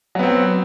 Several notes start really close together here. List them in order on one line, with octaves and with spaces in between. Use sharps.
F#3 B3 C4